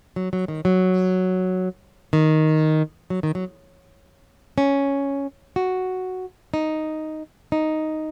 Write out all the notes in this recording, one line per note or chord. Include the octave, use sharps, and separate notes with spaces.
F#3
F#3
D#3
F#3
D#3
F#3
D#3
F#3
C#4
F#4
D#4
D#4